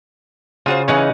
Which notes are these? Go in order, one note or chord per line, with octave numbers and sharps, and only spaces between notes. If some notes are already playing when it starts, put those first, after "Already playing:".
C#3 F4 F#4 C5
C#3 E3 C#4 D#4 C#5 F#5